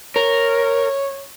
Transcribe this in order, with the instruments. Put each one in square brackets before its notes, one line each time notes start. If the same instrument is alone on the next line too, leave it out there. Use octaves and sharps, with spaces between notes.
[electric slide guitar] A#4 [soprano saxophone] C#5